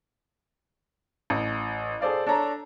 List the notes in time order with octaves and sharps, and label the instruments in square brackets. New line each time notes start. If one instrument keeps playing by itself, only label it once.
[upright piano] A1
G#4 A4 C5 D5 F5
D4 A4 C#5 A#5